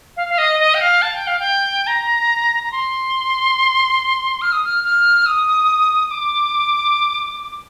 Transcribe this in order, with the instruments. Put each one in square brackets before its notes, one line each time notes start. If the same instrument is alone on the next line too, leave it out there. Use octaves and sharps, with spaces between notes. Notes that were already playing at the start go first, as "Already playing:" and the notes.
[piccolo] F5
F5
D#5
D#5
G5
F5
A5
G5
F5
G5
A#5
A#5
C6
F6
D#6
F6
F6
D#6
D6